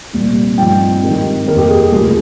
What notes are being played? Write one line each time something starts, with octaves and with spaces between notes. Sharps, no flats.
C2 A#2 F3 C4
G2 F3 C4 D#4 G5
G#2 D#3 G3 C4 D#4
F1 D#2 D#3 A#3 A#4
G4
G#4
G#4
C#2 C3 F3 G#4